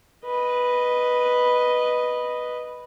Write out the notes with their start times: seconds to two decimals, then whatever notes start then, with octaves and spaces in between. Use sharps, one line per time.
0.26 B4 D#5